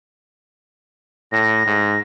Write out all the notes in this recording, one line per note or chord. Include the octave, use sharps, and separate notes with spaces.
A2 A#6
G#2